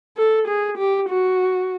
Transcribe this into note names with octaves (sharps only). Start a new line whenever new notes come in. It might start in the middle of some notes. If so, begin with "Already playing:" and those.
A4
G#4
G4
F#4